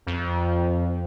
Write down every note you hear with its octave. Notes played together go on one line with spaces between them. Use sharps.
F2